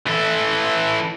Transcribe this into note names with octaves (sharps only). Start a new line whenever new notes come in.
E3 A4